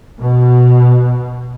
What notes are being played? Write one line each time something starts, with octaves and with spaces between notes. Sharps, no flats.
B2